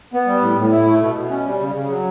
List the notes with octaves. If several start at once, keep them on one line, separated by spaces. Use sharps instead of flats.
B3
G3
A2
A2
E4
A3
B2
B2
C#4
G3
C#3
C#3
F#3